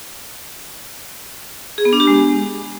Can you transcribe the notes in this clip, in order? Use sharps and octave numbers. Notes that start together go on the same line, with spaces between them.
G#4
B3
D4
G4
G#3